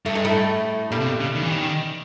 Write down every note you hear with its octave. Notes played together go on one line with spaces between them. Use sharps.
G2 A3
G#3
A2 A3
G2 A#2 G3
C3
B2
C#3
D#3
E3
D#3